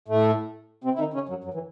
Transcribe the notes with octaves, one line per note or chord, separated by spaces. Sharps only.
A2 A3
C3 C4
E4
D#3 D#4
C#3 C#4
F#2 F#3
F#2 F#3
E3